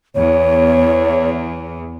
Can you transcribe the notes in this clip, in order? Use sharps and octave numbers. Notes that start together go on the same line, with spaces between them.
E2 C#5